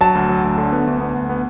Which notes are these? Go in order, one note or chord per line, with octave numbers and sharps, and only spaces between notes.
F#3 A5
D2
F#3
D2
D3
B3
D2
B3
D2
B3